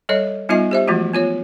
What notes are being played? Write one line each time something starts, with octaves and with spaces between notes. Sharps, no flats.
G3 A4 C#5 D#5
G3 B3 D#4 F4 D#5 G#5
G4 C5 E5
E3 F3 G#3 A3 F4 F#4
B3 F4 C#5